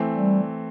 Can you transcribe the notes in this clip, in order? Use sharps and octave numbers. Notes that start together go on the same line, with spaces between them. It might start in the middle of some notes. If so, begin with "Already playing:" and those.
Already playing: E3 A3 C4
G3